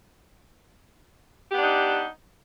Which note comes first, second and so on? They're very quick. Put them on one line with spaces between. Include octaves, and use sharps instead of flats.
G4 B3 D4 D#4